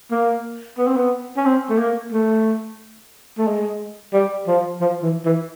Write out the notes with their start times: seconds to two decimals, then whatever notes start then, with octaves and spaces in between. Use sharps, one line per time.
0.11 A#3
0.78 B3
0.87 C4
0.96 B3
1.37 C#4
1.45 C4
1.70 A3
1.79 A#3
2.12 A3
3.38 A3
3.47 G#3
4.14 G3
4.47 F3
4.81 F3
5.03 E3
5.25 E3